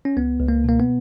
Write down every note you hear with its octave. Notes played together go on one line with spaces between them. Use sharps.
C#4
C#2 B3
C#2
A#3
B2 A#3
B3